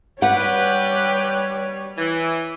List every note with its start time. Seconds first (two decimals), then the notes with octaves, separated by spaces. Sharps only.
0.22 G3 G4 B4 C#5 F#5
1.98 E3